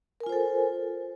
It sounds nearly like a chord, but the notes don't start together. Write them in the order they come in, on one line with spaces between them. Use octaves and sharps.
A#4 G#5 F4 C5 A4